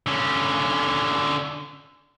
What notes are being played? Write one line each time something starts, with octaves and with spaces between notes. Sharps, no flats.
D3 C#4